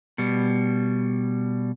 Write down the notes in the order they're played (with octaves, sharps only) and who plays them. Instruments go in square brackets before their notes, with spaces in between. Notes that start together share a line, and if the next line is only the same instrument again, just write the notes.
[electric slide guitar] B2 G3